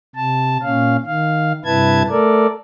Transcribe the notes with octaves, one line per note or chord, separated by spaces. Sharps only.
C3 A5
A#2 C#4 F5
D#3 F5
G2 C3 E4 B4 A5 G#6
A3 A4 A#4 D5